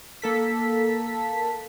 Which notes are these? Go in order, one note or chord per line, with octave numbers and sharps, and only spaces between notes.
A#3 A4 B6